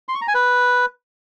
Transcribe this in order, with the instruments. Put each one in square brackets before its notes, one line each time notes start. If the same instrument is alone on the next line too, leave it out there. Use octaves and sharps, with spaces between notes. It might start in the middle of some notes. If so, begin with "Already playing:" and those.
[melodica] C6
C#6
A#5
G#5
B4